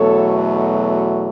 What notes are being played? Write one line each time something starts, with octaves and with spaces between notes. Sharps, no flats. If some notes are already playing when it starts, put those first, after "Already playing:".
Already playing: E2 B2 F#3 A3 A4 C#5